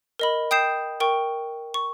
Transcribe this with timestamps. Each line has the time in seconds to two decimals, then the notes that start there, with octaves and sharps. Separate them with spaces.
0.19 A#4 D#5 B5
0.51 G5 D#6 G6 C7 E7
1.00 A#4 G5 C#6
1.74 C#6